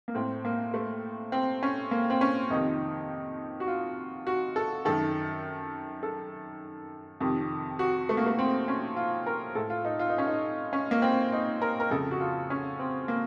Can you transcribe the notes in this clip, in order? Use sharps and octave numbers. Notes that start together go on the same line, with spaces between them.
A#3
A2 C4
A#3
A3
C4
C#4
A#3
C4
C#4
F2 C3 D#3 D#4
F#4
F4
F#4
A4
F#2 D#3 A4
A4
F2 C3 D#3
F#4
A3
A#3
A3
C4
C#4
F4
A#4
A2 A4
F4
D#4
F4
D#4
C#4
D#4
C#4
A#3
C4
D#4
A#4
A#4
F2 C#3 A4
F#4
F4
C#4
C4
A#3